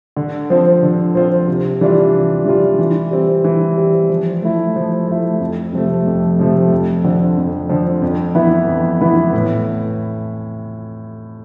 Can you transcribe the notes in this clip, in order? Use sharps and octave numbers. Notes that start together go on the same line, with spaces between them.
D3
F3 C4 F4 C5
D3
F3 C4 F4 C5
C3
E3 G3 D4 F4
C3
E3 G3 D4 F4
E3
G3 C4
E3
G3 C4
F3
A3 E4
F3
A3 E4
F2
C3 F3 A3
F2
C3 F3 A3
F2
D3 F3
F2
D3 F3
F2
E3 B3 E4 B4
F2
E3 B3 E4 B4
A2